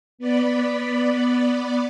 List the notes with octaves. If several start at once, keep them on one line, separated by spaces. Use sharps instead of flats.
B3 D5 B5